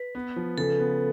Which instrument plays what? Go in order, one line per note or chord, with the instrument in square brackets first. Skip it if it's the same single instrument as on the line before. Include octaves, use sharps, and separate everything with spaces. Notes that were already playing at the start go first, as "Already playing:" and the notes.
Already playing: [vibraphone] B4
[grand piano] B3
F3
[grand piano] C#3 [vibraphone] A4
[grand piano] B3